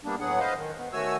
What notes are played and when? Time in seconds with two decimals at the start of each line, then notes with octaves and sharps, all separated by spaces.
0.04 G3 A#3 B3 D4
0.20 A2 F#3 B3 G#4 F#5
0.40 B4 C5 D#5 F5
0.56 D#3
0.78 B3
0.93 D#3 A3 F#4 C#5 G#5 E6